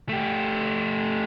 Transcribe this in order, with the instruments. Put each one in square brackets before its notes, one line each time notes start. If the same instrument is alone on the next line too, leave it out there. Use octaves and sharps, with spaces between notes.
[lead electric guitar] A3 G4